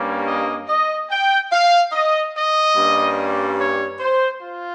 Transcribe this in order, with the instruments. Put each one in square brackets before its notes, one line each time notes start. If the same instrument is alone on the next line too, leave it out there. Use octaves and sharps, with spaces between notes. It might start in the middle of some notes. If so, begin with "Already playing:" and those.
Already playing: [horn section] G2 G3 A#3 C#4
D#5
D#5
G5
F5
D#5
D#5
G2 G3 A#3 C#4
C#5
C5
F4